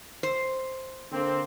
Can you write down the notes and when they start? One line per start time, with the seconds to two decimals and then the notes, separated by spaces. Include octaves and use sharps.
0.23 C5
1.12 D3 A#3 C4